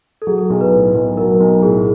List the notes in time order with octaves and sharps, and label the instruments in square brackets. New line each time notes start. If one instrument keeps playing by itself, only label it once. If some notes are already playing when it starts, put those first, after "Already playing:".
[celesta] A4
[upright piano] F#3 [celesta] G#4
[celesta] A4
[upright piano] B1
[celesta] B4
[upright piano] A2
B1
[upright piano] F#3 [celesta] A#4
[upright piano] B1
[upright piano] A2 [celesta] G#4